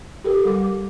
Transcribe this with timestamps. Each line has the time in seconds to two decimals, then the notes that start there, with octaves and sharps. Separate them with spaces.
0.24 G4 A4 A#4
0.45 G3 D6